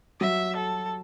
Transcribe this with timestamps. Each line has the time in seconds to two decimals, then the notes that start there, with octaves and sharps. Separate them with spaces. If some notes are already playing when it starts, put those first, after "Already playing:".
0.20 F#3 E5
0.56 A4